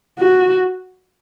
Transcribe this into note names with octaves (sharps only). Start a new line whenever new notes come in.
F#4